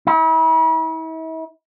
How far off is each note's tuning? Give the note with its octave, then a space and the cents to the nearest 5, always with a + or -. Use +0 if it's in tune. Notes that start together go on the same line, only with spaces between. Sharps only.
E4 -40